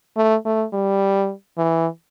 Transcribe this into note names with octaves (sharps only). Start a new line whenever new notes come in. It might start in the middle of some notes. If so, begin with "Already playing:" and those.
A3
A3
G3
E3